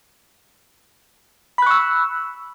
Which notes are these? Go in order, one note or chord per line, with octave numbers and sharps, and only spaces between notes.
B5 C#6 E6 F#6